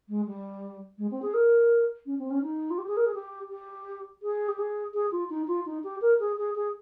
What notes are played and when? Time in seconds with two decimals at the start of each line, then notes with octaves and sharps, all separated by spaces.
0.08 G#3
0.26 G3
0.98 G#3
1.11 C4
1.22 G#4
1.34 A#4
2.06 C#4
2.18 C4
2.30 C#4
2.42 D#4
2.70 F4
2.78 G4
2.87 G#4
2.96 A#4
3.06 G#4
3.14 G4
3.49 G4
4.22 G#4
4.48 G4
4.58 G#4
4.94 G#4
5.11 F4
5.30 D#4
5.47 F4
5.65 D#4
5.83 G4
6.01 A#4
6.19 G#4
6.37 G#4
6.55 G#4